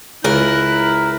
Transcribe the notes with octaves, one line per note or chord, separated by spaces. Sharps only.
C#2 E4 A#4 F#6